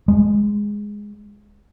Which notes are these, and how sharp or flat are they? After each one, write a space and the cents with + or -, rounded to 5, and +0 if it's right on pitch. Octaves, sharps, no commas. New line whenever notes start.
G#3 -5